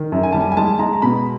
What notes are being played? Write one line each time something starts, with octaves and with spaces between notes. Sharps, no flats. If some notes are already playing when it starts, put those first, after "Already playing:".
Already playing: D#3
F#2
G#5
G3 A5
G#5
G#5
G#3 A5
G#3 A#5
A#5
B2 B5